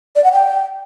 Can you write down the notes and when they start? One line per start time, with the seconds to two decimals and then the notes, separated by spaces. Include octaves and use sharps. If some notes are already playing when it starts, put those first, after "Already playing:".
0.16 D5
0.24 F#5
0.32 G5